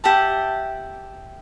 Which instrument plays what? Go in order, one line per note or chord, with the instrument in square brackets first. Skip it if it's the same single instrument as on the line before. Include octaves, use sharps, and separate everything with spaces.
[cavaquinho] G4 E5 F#5 A5